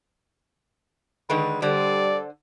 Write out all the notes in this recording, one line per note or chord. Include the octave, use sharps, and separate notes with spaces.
D3 D#3 G#3 B4
D3 G3 A4 C5 D5